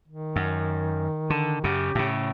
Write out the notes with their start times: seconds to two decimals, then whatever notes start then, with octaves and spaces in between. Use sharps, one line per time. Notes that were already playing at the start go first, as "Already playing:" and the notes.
0.08 D#3
0.36 F#2
1.30 D3
1.64 F#2 C#3 G4
1.95 A2 C#3